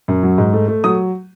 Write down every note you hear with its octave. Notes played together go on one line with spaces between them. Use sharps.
F#2
F#3
G#2
A3
A3
F#3 D#6